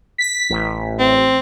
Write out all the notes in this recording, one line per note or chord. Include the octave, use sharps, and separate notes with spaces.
B6
A1
C4